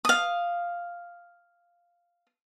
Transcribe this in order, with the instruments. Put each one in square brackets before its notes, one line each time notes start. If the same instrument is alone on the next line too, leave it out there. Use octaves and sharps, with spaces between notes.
[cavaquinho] F5 D#6